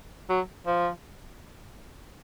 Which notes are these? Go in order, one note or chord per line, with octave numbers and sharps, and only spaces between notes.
F#3
F3